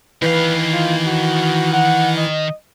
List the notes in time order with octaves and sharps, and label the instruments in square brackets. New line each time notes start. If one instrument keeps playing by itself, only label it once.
[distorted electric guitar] D#3 F5 [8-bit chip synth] E3 E4 [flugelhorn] B4
[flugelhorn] F4
F#4
F#5
D#5